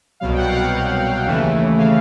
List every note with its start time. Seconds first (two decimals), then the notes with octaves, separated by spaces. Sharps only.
0.20 C2 B2 F#3 F5
0.32 G5
0.37 F#5
0.48 F5
0.55 F#5
0.72 C2 B2 F#3
1.25 D#2 C#3 E3 A3
1.77 C#3 E3 A3 F5